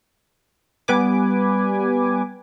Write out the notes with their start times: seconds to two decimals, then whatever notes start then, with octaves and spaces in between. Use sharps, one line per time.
0.88 G3 B3 B4 G#5 D6